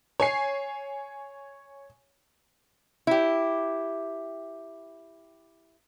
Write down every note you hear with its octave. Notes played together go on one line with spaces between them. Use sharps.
C#5 G#5 C7
E4 G4